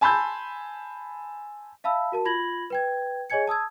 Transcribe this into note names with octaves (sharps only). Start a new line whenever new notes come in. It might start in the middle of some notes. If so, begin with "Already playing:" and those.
G#5 A5 B5 C6 E6 G6
E5 F5 A5 B5 E6
F#4 A#4 A5
F4 B5 G#6 A#6 F#7
B4 G5 G#6
G#4 C#5 D#5 G#5 G#6 C#7
A5 D#6 E6 G#6